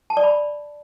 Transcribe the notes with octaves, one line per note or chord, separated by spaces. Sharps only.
A5
D5
B5